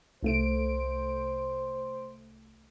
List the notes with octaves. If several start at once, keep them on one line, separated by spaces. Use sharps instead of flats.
C2 A3 C5 D7